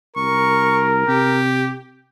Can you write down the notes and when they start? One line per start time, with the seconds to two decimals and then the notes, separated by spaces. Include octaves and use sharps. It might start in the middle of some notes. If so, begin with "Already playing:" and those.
0.16 C2 A#4 C#6
1.08 C3 G4